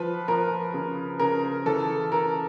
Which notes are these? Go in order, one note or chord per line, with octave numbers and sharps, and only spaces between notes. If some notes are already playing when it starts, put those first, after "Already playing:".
Already playing: F3 B4
F3 A#4
C#3
C#3 A#4
E3 A4
C#3 A#4